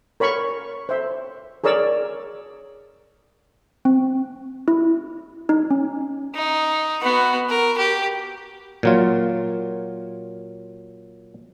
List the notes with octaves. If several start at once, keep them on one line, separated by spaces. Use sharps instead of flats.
A#4 C#5 B5 C#6
C5 E5
G#4 A#4 C#5 D5 E6
C4
E4
D#4
C#4
D#4
B3 F#4
A#4
G4
A#2 F#3 F4